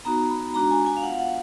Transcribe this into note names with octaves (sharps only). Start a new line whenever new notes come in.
B3 D#4 F#4 A#5
B5
G#3 D4 F#4 A#5
G#5
G#5
F5
B3 F4 F#5
F#5